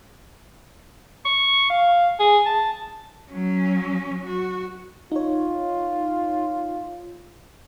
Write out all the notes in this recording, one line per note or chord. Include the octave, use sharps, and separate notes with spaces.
C#6
F5
G#4
A5
F#3 C#4
F#4
D#4 F4 C#5